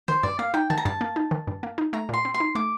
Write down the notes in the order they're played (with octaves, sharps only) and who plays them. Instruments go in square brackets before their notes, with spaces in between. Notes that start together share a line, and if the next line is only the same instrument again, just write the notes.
[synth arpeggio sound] D#3 [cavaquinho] C5
[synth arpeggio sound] G2 [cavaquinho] D5
[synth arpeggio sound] A#3 [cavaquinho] F5
[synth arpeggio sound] D#4 [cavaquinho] G5
[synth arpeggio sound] D#3 [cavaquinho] A5
[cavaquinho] A#5
[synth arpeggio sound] G2 [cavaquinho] A5
[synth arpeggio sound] A#3
D#4
D#3
G2
A#3
D#4
[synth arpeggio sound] A3 [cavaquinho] A#5
[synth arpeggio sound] A#2 [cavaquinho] C6
[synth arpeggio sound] C4
[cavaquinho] C6
[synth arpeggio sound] D#4
[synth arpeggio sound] A3 [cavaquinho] D6